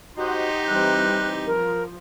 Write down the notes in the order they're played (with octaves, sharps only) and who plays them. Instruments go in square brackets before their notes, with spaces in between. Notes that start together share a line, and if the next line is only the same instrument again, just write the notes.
[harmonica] D#4 G4 [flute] F#4 [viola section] C5 D#5 F#5
[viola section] E3 G3 C4 [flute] F#6
[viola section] F3 [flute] A#4